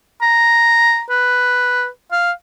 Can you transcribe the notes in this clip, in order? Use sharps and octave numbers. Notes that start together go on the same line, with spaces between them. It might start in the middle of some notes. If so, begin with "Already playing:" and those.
A#5
B4
F5